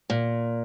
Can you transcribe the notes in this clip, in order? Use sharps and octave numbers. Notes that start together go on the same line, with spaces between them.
A#2